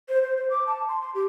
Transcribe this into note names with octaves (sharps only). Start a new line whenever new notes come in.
C5
C5
C5
D6
A5
C6
C6
G4